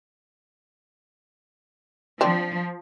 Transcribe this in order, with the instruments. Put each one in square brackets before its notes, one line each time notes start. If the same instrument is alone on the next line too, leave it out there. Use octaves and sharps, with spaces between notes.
[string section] F3 [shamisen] C4 D4